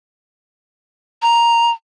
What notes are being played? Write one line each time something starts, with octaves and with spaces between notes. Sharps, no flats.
A#5